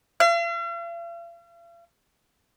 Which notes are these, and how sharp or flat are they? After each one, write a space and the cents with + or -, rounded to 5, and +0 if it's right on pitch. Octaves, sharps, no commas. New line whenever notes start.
F5 -45